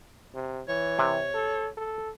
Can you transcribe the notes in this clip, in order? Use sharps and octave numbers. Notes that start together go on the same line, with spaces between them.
C3
E3 C#5
C3
A4
A4